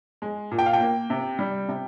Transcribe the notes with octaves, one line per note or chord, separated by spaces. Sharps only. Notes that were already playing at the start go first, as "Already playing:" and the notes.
G#3
A#2
G5
F5
G5
A#3
C3
G3
C3